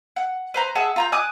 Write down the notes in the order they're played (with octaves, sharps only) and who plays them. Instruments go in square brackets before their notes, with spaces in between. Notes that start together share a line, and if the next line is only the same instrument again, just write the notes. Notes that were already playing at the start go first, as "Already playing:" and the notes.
[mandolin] F#5
B4 C5 A#5
G#4 E5 F#5 A5
F4 A#5 G6
G#5 D6 D#6 F#6